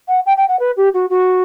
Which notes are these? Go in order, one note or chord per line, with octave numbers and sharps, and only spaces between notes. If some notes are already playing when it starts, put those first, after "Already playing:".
F#5
G5
G5
F#5
B4
G4
F#4
F#4